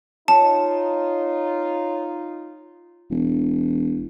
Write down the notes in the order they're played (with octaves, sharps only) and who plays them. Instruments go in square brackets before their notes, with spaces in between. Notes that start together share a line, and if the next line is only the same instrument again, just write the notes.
[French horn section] D#4 F4 [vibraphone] C#5 [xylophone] A5
[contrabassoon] E1